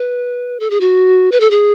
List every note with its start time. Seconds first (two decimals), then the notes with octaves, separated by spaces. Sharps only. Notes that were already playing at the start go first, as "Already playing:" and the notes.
Already playing: B4
0.60 A4
0.70 G#4
0.80 F#4
1.32 B4
1.40 A4
1.51 G#4